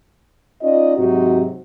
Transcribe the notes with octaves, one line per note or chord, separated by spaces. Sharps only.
C#4 D#4 F4 D5 D#5
G#2 C3 F#3 D#4 F#4